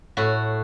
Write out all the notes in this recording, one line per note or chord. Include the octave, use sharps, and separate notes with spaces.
A2 F#4